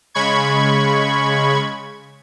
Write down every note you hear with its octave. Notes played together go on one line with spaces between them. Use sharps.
C#3 G#3 B5 C#6 G#6